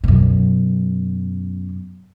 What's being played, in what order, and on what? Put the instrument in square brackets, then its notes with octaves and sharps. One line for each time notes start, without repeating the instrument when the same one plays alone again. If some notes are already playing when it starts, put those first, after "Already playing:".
[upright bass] F#2 B2